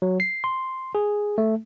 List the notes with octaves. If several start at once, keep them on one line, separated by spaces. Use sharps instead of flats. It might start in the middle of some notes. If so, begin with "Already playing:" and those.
F#3
C7
C6
G#4
A3